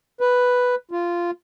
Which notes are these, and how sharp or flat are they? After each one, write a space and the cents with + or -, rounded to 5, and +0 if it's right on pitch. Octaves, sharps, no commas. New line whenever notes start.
B4 +0
F4 -10